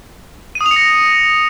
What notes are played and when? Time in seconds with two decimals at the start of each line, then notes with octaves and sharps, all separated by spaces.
0.55 D#7
0.61 D#6
0.66 F7
0.71 C#7
0.76 A#6